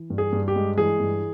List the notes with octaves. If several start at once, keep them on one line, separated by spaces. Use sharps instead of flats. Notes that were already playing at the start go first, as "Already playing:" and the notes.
Already playing: E3
G2
G#4
G2
G4
G#3
E3 G#4
G2